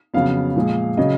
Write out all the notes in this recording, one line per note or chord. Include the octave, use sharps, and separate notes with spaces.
F2 C#3 F#3 B3 F5
A#2 F3 G#3
C#3 F#3 D#5